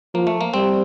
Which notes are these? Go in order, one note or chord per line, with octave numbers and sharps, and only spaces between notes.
F3 A#3
A3
A#3
G3 C4